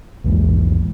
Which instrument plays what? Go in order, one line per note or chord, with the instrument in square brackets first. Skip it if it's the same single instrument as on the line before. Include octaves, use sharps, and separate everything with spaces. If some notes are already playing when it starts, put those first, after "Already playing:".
[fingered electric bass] A#1 E2 G#2